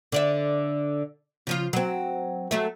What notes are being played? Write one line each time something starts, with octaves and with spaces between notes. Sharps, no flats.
D3 D5 E5
C#3 F3 F4
F#3 C4
F#3 A3 E5